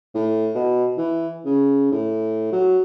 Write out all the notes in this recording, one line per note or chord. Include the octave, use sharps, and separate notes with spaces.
A2
B2
E3
C#3
A2
F#3